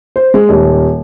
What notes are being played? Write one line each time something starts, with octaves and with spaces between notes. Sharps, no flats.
C5
G#3
D#1